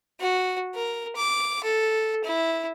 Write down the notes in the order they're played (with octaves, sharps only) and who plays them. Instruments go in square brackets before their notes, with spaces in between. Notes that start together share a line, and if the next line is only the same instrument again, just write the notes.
[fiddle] F#4
A#4
D6
A4
E4